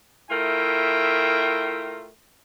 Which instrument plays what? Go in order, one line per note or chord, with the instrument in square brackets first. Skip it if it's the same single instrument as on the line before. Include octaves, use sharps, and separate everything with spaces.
[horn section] A3 E4 F4 A#4 E5 G5